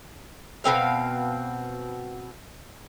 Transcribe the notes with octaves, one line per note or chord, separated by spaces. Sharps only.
B2 G3 C4 F5